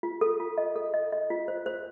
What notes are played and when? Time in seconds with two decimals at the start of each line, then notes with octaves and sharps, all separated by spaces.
0.03 F4
0.21 A4
0.40 F4
0.58 D#5
0.76 A4
0.94 D#5
1.12 D#5
1.30 F4
1.48 C5
1.66 C5